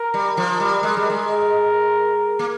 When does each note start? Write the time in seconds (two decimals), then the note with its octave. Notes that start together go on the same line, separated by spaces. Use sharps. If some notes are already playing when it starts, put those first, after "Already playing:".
Already playing: A#4
0.14 G3
0.37 F3
0.60 G3
0.83 G#3
0.97 G3
1.07 G#3 A#4
2.39 A#3